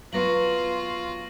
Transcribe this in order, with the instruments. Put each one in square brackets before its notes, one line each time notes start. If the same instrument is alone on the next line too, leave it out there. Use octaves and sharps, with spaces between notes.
[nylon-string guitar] F#3 B3 [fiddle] F4 [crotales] C#6 A#6 F#7